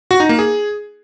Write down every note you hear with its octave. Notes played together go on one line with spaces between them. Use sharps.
F#4
D#4
A#3
G#4